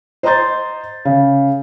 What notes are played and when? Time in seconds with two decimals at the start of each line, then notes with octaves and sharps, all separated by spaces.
0.23 C5 D#5 A#5 C6 G6 A6
1.05 C#3